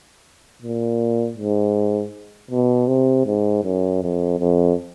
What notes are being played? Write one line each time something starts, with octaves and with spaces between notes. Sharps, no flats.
A#2
G#2
B2
C3
G#2
F#2
F2
F2